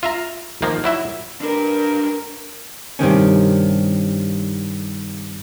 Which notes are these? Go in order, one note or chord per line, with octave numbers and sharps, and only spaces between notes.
F4 E5 A#5
D#3 F3 A#3
F#3 E4 E5
D4 A#4 B4
G2 C3 D#3 C#4